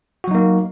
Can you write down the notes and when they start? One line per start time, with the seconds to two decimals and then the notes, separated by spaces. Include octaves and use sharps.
0.24 F#4
0.28 F#3
0.31 D#4
0.35 A#3